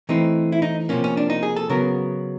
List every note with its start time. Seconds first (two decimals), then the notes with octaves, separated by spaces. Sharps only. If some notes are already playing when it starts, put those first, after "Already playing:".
0.09 E3 A3 C4 D#4
0.52 E4
0.62 D#4
0.89 C3 F3 A#3 C#4
1.04 C#4
1.17 D4
1.30 D#4
1.43 G#4
1.56 A4
1.70 C#3 F#3 B3 A#4